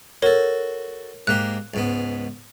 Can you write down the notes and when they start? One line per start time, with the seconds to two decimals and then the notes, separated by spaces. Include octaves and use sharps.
0.22 F#4 A4 A#4 C#5
1.27 G#2 A#3 G4 F#6
1.74 C#2 G#2 B3